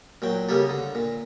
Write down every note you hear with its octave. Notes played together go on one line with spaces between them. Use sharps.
A#2 F#3 G5
C#3 G3 A#3 G4 A4
D3
A#2